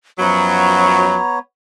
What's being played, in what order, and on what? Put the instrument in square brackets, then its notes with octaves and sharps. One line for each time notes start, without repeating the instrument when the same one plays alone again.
[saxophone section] F#2 F3 F#3 [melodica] B3 C#5 [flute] A#5